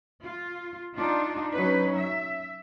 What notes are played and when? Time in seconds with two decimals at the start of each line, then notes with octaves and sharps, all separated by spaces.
0.25 F4
0.95 D4 D#4 F4
1.52 F#3 C#4 D#4 B4
1.96 E5